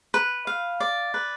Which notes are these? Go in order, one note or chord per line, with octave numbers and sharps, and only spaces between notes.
B4
F5
D5
B4